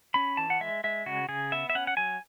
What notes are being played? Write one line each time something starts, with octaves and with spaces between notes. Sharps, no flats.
C#4 B5
E3 A5
F#5
G#3 E5
G#3 E5
C#3 F#4
C#3 G#4
B3 E5
E5
C#4 F#5
F#5
F#3 G#5